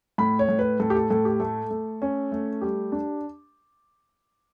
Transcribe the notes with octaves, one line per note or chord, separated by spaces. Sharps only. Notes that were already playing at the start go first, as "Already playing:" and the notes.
A2 B5
C#5
A2
B4
A2 A4
G4
A4
A2 A4
G4
A3 A4
A3
C#4
A3
G3 G4
D4